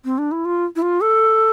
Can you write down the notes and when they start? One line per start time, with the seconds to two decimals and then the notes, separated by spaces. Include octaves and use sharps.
0.05 C4
0.18 D4
0.32 E4
0.45 F4
0.76 E4
0.82 F4
1.01 A4